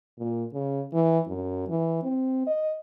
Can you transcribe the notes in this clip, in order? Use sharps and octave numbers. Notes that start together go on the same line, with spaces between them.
A#2
C#3
E3
F#2
E3
C4
D#5